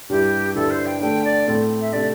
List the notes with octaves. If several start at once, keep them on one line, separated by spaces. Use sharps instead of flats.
G2 G3 E4 G4
G2 D3 G3 E4 A4
C5
G5
D3 A3 D4 G5
D5
A2 A3 C4
E5
C3 A3 D4 D5